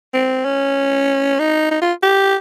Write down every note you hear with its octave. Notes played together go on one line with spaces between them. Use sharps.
C4
C#4
D#4
D#4
F4
G4